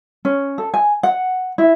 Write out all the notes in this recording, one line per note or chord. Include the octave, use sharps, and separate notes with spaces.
C#4
A4
G#5
F#5
E4